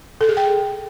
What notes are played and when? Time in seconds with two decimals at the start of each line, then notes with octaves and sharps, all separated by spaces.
0.21 A4
0.29 G#4
0.37 G5